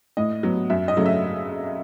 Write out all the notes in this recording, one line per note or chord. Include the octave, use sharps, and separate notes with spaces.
A2 D#5
F#3 B3
F#2 E5
D#5
C#3 F#3 A3
E5